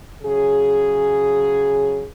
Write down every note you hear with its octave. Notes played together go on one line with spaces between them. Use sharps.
C#3 F#3 G#4